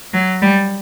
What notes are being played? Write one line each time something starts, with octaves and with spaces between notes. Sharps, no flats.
F#3
G3